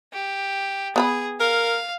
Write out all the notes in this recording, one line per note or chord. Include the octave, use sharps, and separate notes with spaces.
G4
B3 G#4 A#5 B5
A#4 F5